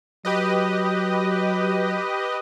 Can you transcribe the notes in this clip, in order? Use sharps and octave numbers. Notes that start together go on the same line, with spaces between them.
F#3 G4 B4 D#5